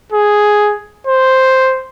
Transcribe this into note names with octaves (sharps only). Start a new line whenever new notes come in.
G#4
C5